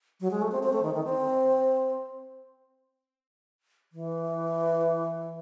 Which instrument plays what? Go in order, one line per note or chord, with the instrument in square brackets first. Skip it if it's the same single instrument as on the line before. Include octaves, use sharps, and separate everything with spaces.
[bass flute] F#3
G#3
A3
C4
C4
A3
D#3
D#3
C4
E3